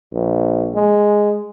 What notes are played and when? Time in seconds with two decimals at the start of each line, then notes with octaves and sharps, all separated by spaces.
0.13 A#1
0.75 G#3